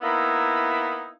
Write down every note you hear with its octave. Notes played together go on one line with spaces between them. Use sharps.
A#3 B3 D#4 E4